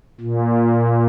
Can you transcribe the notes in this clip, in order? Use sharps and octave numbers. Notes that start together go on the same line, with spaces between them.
A#2